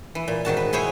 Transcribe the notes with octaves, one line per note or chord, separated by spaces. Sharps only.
E3
A#2
G#2 D#3 F#4 A5
B4
E4 G#4 C5 C#5